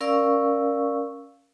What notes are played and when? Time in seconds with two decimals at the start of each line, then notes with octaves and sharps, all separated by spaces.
0.01 C#4 A#4 D5 F5 C#6 E6